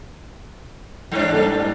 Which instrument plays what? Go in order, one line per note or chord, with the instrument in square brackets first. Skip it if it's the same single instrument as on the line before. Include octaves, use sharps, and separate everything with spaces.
[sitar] G2 D4 [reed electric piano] E3 C#5
[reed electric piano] G3 A#3 A4